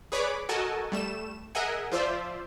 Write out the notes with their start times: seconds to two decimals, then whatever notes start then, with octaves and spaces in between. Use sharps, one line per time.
0.12 G#4 B4 C#5 D5 B5 D6
0.49 F#4 A4 A#4 D#5 G#5 A5
0.92 G3 A3 E7
1.55 G#4 A#4 D#5 E5 F#5 G#5
1.92 F3 F4 C5 D5 E5